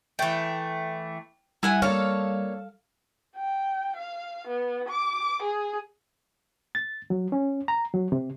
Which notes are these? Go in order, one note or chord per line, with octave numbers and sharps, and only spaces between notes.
E3 A3 G5
G3 E4 F#5 G#5
A#3 D4 A4 C#5 F5
G5
F5
B3
D6
G#4
A6
F#3
C#4
A#5
F#3
C3